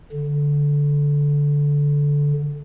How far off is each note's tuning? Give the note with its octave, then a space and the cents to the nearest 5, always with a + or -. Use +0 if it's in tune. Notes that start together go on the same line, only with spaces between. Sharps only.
D3 -15